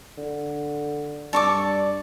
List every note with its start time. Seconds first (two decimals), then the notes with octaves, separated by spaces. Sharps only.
0.18 D3
1.33 G2 A4 D5 C#6 D6